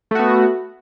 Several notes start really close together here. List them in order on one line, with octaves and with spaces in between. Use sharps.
A3 F#4 B3